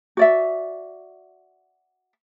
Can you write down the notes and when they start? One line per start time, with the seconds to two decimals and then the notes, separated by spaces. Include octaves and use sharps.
0.17 F#4 D5 E5